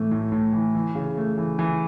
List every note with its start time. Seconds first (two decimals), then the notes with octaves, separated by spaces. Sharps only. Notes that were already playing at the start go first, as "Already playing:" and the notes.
Already playing: A2 E3 A3
0.11 A2
0.32 A2
0.53 E3
0.75 E3
0.95 C#3
1.17 A3
1.38 E3
1.59 E3